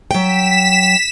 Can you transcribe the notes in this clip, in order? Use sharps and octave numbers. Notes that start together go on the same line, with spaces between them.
F#3 G5 B6 E7